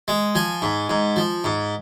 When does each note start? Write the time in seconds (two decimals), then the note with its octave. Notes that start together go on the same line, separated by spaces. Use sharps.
0.08 G#3
0.35 F3 G#5
0.62 G#2
0.90 G#2
1.16 F3
1.44 G#2